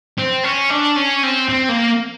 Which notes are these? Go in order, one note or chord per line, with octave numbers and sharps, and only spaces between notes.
C4
C#4
D4
C#4
C4
C4
A#3